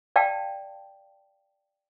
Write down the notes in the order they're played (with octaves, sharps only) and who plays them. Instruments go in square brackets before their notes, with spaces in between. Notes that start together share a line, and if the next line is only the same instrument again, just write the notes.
[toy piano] D5 F5 G5 A5